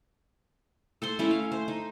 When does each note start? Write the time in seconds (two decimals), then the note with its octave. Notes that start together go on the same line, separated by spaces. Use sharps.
1.02 A4 C5 C6
1.19 A3 C#4 E4
1.31 F5
1.52 C5
1.68 D#4